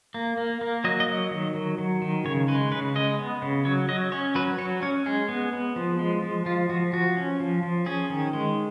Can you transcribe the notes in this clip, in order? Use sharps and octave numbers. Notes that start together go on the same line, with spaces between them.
A#3
A#3
A#3
F#3 D#5
D#5
F#3
D#3
F#3
F#3
D#3
C#3 C#5
G#3 B4
C#3 B4
G#3 D#5
B3
C#3
F#3 C#5
F#3 D#5
C#4 C#5
F#3 B4
F#3 C#5
C#4 C#5
G#3 G#4
B3
B3
F3
G#3
F3
F3 F4
F3 F#4
F3 F#4
C#4
F3
F3
C#4 G#4
D#3
G#3